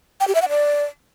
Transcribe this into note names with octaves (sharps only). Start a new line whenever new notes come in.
G5
G4
E5
F#5
D5